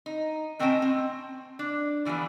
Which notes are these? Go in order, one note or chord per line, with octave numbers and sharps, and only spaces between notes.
D#4
A2 C4 C#4 D#5 G5 A5
C4
D4
D3 E3 F3 G3 B3